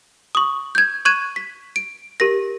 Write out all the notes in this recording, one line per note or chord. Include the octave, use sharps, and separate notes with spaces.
C#6 D#6
G6 G#6
C#6 F#6 G#6 D#7 E7
B6
D7
G4 A#4 A#6